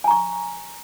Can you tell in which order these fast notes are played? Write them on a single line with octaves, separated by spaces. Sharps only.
G#5 A#5 C#6